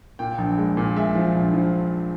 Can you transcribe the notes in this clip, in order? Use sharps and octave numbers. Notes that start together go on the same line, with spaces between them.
A#2 G5
A#1
G#3
A#2
G#3 E5
F3
A#1
F3